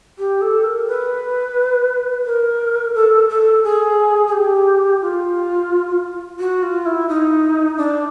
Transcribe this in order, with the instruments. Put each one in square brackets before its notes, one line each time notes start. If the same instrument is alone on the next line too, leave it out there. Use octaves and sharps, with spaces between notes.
[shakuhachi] G4
A4
A#4
B4
A#4
A4
A4
G#4
G#4
G4
F4
F#4
F4
E4
D#4
D4